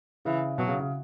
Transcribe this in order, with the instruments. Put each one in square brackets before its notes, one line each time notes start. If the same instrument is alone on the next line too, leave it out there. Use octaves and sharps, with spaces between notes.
[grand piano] C#3 [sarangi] E3
[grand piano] B2 [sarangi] F#3
[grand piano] C#3
C#3